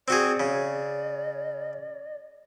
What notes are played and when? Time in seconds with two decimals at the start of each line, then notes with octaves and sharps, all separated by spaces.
0.08 C4 F#4 G#4 D5
0.40 C#3